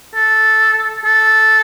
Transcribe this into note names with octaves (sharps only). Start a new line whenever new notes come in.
A4
A4